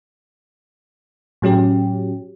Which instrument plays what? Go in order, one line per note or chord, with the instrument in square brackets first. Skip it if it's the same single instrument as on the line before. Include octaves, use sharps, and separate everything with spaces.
[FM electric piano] A2 F#3 C#4 G4